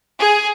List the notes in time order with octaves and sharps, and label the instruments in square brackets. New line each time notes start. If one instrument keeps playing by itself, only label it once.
[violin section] G#4